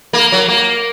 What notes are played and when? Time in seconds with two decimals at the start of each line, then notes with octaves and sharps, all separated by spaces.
0.13 A#3
0.32 F#3
0.48 A#3